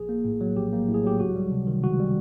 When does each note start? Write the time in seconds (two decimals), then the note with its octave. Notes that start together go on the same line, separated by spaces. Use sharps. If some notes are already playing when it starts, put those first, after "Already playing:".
Already playing: A#1 G#4
0.09 A#3
0.25 A2
0.41 F#3
0.57 A#1 G4
0.73 A#3
0.89 A2
0.94 G#4
1.04 F#3 G4
1.20 C#2 F#4
1.36 G3
1.51 C3
1.67 D#3
1.83 C#2 F#4
1.99 G3